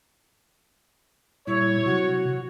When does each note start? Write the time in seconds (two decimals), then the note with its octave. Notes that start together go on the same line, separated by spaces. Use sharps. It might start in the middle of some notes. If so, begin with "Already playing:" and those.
1.47 A#2 G3 E4 C#5
1.86 C3 F#3 F#4